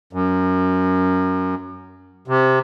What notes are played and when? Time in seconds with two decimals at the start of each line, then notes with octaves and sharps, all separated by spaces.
0.13 F#2
2.28 C3